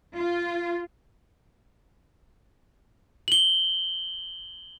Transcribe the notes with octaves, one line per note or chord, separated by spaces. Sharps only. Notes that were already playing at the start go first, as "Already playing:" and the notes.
F4
F#7 G7